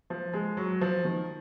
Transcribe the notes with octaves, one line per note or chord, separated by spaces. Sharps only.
F3
G#3
F#3
F3
D#3